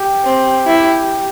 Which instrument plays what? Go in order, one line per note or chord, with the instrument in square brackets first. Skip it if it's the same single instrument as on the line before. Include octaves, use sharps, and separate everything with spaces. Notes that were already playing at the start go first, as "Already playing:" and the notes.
Already playing: [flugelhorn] G4
[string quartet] C4
E4